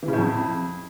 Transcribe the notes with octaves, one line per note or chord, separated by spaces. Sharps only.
E3
C#3
A2
F2